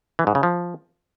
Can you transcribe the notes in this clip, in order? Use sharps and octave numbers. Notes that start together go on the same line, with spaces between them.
E3
G#2
C#3
F3